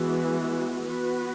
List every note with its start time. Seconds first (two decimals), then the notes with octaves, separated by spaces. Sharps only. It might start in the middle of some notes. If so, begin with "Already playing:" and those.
Already playing: E3 G#3 B3 F#4
0.88 B3 F#4 B4